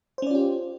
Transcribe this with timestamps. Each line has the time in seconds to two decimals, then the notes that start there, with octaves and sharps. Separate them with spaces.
0.18 C5
0.22 C#4
0.27 D5
0.31 F4
0.35 G4